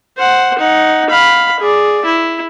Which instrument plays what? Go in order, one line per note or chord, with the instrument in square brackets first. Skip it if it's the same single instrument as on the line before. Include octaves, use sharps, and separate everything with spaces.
[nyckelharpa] C5 F#5
D#4 F#5
F5 B5
G#4 D5
E4